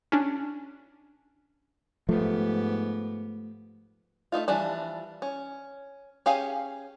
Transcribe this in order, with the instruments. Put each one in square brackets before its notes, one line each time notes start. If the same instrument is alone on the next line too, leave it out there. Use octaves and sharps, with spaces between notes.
[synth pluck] C#4 D4
[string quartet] G#2 B3 G4 [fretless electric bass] F3 A3
[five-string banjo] A3 A#3 D#4 F4
E3 F3 G3 D4
C#4
C#4 G4 G#4 F5 G#5